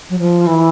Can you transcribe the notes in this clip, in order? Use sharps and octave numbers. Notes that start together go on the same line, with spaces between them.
F#3
F3
E3